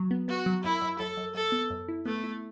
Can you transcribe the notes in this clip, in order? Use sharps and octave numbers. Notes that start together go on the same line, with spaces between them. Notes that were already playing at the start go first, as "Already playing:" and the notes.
Already playing: F#3
B3
B3 F#4
F#3
F#2 E4
F#2
F#2 A4
F#2
F#2 A4
B3
F#2
E4
A3 B3
E4